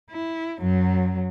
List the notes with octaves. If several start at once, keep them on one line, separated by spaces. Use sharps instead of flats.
E4
F#2 F#3